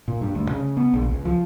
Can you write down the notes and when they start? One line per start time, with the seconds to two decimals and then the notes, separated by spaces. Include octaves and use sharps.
0.08 A#2
0.21 G2
0.35 D2
0.51 C#3
0.77 B3
0.94 A#1
1.09 C#2
1.25 F3